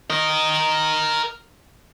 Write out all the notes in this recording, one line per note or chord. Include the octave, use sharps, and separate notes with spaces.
A#4 D#5